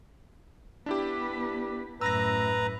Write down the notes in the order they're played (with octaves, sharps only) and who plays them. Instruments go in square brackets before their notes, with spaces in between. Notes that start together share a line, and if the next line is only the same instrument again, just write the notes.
[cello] B3 B4 [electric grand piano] D4 E4 G4
[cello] F#2 A2 [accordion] B4 A#5 [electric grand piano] E6 A#6